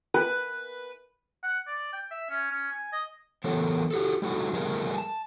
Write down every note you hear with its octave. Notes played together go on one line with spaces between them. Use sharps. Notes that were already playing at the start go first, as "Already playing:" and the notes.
B4
F#5
D5
G5
E5
C#4
C#4
G#5
D#5
E3 F#3 B3 A4 A#4 C#5
F#4 G4 A4
G3 A3 D#4 E4 F#4 A4
F3 G3 A3 G#4 A#4 D#5
G#5 A5